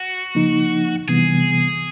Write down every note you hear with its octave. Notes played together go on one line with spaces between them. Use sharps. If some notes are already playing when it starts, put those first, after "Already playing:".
Already playing: F#4
C#3 F3 A#3 D#4
C3 E3 G3 B3 G#4